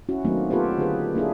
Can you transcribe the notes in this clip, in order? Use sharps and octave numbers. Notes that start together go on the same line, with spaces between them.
C#4 E4 F#4
D#3 F#3 A3 A#3 C4 D#4
B3 F4 G4 A4 B4 C#5
D3 G#4 B4
A#3 D4 E4 G#4